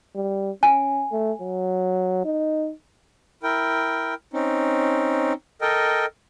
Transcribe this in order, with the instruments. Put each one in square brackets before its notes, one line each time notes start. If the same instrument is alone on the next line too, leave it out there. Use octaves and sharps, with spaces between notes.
[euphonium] G3
[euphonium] C#4 [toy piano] G#5
[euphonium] A3
F#3
D#4
[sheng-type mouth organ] E4 A#4 G5
C4 C#4 D#4
A4 A#4 D#5 G5